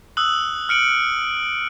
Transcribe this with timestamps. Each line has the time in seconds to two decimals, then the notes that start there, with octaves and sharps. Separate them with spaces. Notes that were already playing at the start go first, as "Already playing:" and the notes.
0.17 D#6 E6 F#6 F#7
0.69 F6 C#7 D7 F#7